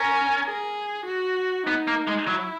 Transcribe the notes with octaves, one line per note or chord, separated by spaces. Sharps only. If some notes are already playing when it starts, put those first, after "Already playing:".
Already playing: C#4 A#4
G#4
F#4
B3 D#4
A#3
G#3
F#3 E4